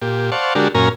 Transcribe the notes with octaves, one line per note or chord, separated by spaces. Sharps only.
A#2 G4
C5 D5 F5 F#5 A5 C#6
D3 G#3 D4 F#4 G4 A#4
F#2 A#2 C#4 A#4 G#5 A#5